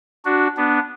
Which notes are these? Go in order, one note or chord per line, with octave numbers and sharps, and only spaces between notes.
D4 F#4
B3 D4